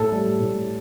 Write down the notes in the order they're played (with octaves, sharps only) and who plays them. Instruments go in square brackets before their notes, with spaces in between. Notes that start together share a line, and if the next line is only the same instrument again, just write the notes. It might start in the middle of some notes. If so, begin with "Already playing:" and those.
Already playing: [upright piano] A2 A4
G3
A2